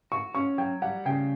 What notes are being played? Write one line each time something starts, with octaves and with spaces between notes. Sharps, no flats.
F#4 C#6
C#4 C#6
F#3 G5
G3 F#5
C#3 G5